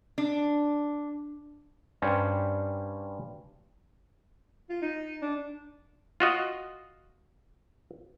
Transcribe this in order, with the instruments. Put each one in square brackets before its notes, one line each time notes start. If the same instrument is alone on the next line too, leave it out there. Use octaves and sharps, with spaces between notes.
[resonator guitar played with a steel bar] D4
[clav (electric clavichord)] G2 G3 C#4 C5
[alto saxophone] F4
D#4
D4
[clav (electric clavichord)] F4 F#4 D#5